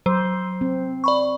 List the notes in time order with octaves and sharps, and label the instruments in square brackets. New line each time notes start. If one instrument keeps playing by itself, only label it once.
[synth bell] F#3 [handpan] C5
[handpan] C4
[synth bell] D5 B5 C#6